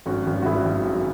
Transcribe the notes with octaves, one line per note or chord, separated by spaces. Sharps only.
G#1 C#4 F#4
G#1
F#4
G#1 E4 G#4
G#1
F#2